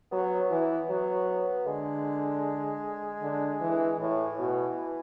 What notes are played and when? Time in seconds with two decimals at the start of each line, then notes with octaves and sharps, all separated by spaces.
0.12 F#3 B3
0.50 E3
0.89 F#3
1.67 D3 G#3
3.22 D3
3.61 E3
3.99 A2 E3
4.39 B2